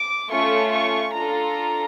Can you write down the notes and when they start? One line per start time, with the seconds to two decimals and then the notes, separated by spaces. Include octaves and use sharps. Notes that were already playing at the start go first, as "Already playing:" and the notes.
Already playing: D6
0.32 A3 C#4 F4 C#6
0.73 C#6
1.15 D4 F4 A4 A#5